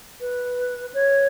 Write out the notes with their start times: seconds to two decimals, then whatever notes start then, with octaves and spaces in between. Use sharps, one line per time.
0.20 B4
0.94 C#5